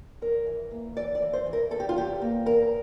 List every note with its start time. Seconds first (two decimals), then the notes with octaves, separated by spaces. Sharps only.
0.22 E2 A#4
0.46 E3
0.71 A#3
0.97 E3 D5
1.15 D5
1.22 E3
1.33 C5
1.46 E3
1.53 A#4
1.71 E2 A4
1.80 G4
1.89 F4
1.96 E2 G4
2.22 A#3
2.46 E2 A#4